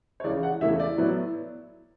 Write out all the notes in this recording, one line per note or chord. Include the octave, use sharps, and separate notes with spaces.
C#5
C#2 C#3 E3 D5
F#5
E2 C#3 E3 A3 E4 E5
D5
A2 F#3 B3 E4